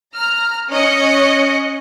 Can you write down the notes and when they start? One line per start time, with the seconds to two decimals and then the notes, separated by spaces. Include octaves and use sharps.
0.15 A#5 F6
0.73 C#4 D#5 F#6 C#7